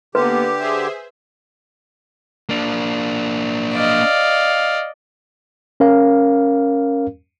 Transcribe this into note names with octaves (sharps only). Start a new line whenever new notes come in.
D3 A#3 B3 G4 B4
G#4 C5 E5
A#3 D4
D5 D#5 F5
C#4 A#4 F5